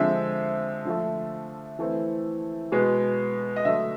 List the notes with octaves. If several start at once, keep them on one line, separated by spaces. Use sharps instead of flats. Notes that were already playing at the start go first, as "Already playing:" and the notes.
Already playing: D3 F3 G#3 C4 E5
D3 F3 A3
E3 A3 C4
B2 G#3 B3
D#5
D3 F#3 A3 E5